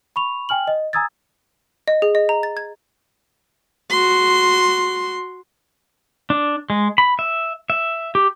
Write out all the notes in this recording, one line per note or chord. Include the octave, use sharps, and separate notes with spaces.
B5 C#6 F7
G5 G#5 F6 F#7
D#5
G#5 A#5 D#6 E6 G#6 A6
D#5
G#4
D#5
A#5
A6
G#6
F#4 C6
D4
G#3
B5
E5
E5
G4